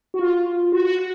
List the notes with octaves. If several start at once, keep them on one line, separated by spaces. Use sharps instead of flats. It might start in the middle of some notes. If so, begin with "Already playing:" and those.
F#4
F4
F#4
F#4
F#4